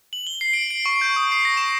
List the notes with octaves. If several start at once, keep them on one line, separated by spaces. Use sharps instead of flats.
F#7
G7
C7
D7
D7
C#6
G6
D#6
C7
A#6
E7